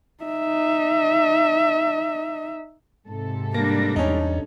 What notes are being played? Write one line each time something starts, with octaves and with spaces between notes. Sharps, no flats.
D#4 E5
G#2 C3 A4
G3 A#3 D4 A#6
E2 C#4 D#4